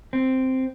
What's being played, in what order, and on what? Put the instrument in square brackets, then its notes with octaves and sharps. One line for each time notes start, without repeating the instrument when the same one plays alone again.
[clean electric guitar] C4